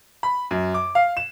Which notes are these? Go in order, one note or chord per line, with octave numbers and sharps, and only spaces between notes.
B5
F#2
D6
F5
E7